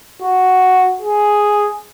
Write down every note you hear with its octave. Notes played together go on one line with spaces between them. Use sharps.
F#4
G#4